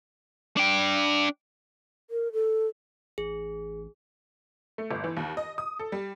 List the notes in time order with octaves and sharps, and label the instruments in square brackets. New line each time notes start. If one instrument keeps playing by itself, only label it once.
[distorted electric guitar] D4 G5
[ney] A#4
A4
[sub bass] A1 [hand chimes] G#4
[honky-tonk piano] A3
G1
E3
D#2
D#5
D#6
A4
G3